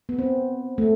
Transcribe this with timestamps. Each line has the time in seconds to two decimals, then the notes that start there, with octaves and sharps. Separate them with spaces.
0.09 B3
0.19 C4
0.78 A3